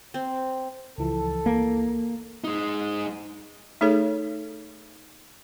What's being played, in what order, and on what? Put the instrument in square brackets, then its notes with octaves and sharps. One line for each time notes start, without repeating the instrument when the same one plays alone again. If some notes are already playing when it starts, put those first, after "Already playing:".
[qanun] C4
[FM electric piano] C#2 E3 F3 [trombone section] A4
[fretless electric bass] A#3
[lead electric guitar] G#3 D#4
[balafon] A3 D#4 G#4 A4 C#5